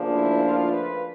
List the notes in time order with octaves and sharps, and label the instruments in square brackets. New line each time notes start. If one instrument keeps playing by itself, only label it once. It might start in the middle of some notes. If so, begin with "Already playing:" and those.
Already playing: [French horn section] D2 C#3 F3 A#3 D4
E4
F4
B4